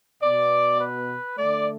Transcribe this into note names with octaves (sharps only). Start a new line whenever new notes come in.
B2 B3 D5
B4
D3 A3 D5